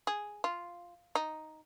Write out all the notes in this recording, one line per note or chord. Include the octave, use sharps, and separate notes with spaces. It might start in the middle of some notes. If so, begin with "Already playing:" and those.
G#4
F4
D#4